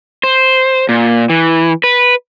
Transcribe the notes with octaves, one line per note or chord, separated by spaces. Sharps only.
C5
A#2
E3
B4